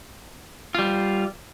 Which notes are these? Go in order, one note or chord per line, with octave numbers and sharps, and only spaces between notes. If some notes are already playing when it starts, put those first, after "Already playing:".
G3 F4